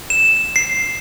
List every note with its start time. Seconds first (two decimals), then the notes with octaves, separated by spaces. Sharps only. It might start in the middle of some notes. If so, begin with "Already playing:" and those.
0.10 E7
0.56 C7